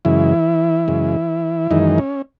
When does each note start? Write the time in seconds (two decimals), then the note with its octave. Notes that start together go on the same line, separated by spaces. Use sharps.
0.05 F#2 C#3 E3 G#3 E4
0.88 F#2 C#3 G#3
1.71 F#2 D#3 E3 G#3 D#4
1.98 C#4